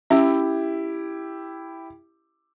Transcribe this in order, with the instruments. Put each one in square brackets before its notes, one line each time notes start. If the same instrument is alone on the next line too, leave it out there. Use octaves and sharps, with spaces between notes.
[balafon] C#4 [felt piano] E4 G4 [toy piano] E5 B5 E6